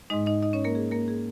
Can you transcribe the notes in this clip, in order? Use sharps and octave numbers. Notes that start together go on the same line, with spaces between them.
G#2 G#3 D#4 D#5
D#4 D#5
D#4 D#5
C#4 C#5
A#3 A#4
G#4
A#3 A#4
G#4